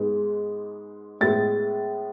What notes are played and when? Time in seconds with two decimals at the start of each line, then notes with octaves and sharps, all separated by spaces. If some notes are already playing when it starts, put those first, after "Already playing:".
Already playing: G#2 G#3 B3
1.21 A2 G#3 B3 A6